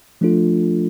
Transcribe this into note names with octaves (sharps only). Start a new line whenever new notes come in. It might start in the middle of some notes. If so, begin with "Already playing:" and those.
F3 A3 D4 F4 A4